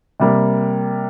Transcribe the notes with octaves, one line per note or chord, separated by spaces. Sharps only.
C3 G3 A#3